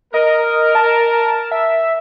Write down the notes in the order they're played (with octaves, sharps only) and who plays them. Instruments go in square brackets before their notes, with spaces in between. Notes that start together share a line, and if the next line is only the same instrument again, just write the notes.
[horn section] A#4 [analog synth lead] D#5
[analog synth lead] A5
E5